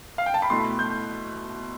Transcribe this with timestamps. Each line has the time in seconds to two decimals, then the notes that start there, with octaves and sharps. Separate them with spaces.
0.18 F5
0.26 G5
0.34 A5
0.42 B5
0.50 B2 A3 E4 C6
0.79 G6